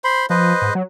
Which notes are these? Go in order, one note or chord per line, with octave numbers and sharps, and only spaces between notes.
C5 B5 C6
F3 B4 C5 D#5
G#2
F#3